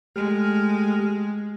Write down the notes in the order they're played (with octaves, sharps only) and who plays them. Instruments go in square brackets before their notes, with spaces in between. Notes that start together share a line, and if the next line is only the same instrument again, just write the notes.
[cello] G#3 [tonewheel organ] A3 G4 F6